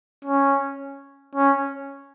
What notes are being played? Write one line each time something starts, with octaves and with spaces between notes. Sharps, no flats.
C#4
C#4